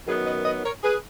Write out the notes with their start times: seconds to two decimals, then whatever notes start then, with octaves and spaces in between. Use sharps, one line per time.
0.06 F#2 D#3 F#3 B3 G#4 B4
0.26 B4 D#5
0.45 B4 D#5
0.64 A#4 C#5
0.84 G#4 B4